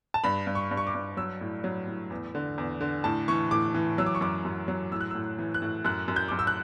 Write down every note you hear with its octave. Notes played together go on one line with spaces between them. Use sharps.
A5
G2 B5
G2
C#6
G2
C#6
D6
G2
F#3 E6
A2
F#3
A2
E2
D3
E2
D3
A2 A5
E3 C#6
A2 D6
E3
F#3 E6
D6
C#6
F#2 D6
F#2
F#3
A2 E6
F#6
E6
A2
E3
F#6
A2
F#2 F#6
F#2
G6
F#2 D6
E6
F#6